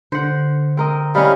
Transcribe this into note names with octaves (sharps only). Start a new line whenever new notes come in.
D3 C5 F#5
C4 A#4 D#5
G3 C#4 E4 D#5 F5